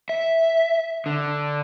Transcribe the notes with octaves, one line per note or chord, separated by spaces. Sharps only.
E5
D3